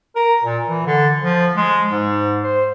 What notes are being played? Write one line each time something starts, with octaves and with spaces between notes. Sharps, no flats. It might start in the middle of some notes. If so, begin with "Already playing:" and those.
A#4
A#2
E3
D3
F3
G#3
G#2
C5